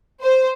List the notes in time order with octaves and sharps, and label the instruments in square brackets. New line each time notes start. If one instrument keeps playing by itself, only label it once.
[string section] C5